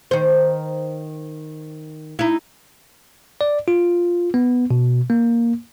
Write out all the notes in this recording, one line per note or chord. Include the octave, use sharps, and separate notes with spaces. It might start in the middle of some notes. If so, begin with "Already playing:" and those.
D#3 C5
D#4 E4
D5
F4
B3
B2
A#3